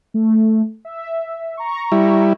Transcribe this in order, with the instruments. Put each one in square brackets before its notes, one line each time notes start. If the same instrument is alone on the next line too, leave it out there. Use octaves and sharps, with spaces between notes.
[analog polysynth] A3
E5
A#5 C#6
[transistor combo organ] G3 E4